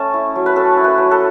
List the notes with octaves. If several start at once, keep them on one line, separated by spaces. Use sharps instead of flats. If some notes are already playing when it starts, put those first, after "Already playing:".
Already playing: A3 C#4 A4
E4
F#3
B4
C#4 A4
E4
B4
F#3
A4